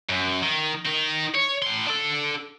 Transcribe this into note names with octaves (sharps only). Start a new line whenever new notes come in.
F#2
D#3
D#3 D#4
C#5
A2 C6
D4 A4